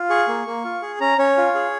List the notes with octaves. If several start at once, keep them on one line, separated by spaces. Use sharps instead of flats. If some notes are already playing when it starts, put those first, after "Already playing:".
Already playing: F4
G#4 C#6
A#3
A#3
F4
G#4
C#4 A#5
C#4 C#5
F4
G#4